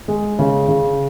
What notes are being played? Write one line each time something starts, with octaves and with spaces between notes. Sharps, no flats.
G#3
C#3
C#3